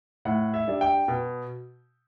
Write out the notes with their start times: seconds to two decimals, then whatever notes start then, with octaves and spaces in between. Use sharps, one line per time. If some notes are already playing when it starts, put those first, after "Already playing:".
0.25 A2 F#5
0.54 E5
0.68 G3 D4
0.81 G5
1.08 B2